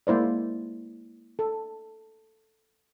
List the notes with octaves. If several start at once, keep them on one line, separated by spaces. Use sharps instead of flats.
G#3 A#3 E4 C5 D5
A4